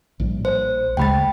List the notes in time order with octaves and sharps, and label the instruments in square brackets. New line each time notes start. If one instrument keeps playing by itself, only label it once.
[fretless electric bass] A#1 A2 G3
[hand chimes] C5
[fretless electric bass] D2 C#3 G#3 [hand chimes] G5 B5 A6